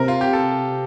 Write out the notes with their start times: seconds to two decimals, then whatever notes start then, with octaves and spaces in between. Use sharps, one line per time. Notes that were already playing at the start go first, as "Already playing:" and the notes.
Already playing: C3 A#4
0.08 F4
0.21 G4
0.33 A4